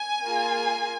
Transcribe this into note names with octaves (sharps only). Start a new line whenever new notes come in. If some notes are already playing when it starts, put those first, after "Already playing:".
Already playing: G#5
A#3 F4 G#4